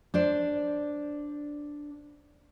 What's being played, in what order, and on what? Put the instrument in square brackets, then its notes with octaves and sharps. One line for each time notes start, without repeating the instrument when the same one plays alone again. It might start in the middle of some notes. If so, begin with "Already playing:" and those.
[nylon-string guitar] D4 C5 D5